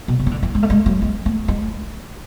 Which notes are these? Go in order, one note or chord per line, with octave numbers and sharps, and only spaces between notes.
B2
C#3
E3
D3
E3
G#3
A3
G#3
F#3
G#3
A3
G#3